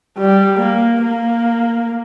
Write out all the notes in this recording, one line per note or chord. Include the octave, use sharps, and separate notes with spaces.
G3
A#3
A#3